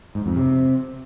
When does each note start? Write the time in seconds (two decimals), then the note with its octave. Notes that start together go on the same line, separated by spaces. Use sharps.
0.15 G#2
0.26 F2
0.36 C3